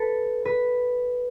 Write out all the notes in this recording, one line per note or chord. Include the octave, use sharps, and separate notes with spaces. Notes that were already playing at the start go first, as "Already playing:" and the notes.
Already playing: A4 B4
B4